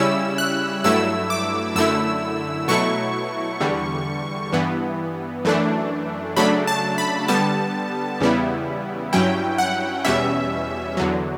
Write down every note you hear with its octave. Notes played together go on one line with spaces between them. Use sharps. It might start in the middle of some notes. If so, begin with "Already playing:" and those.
Already playing: C#3 G3 C#4 E4 E6
F#6
G2 F#3 A3 E4 E6
D6
F#2 D3 A3 E4 E6
B2 F#3 A3 E4 C#6
E2 D3 G3
G2 E3 B3
F#2 E3 A3 D4
C#3 F#3 A3 D4 B5
A5
B5
D3 G3 B3 A5
E2 C#3 G3 B3 E4
G2 F#3 C#4 E4 G5
F#5
E2 B2 G3 C#4 E5
E2 D3 F#3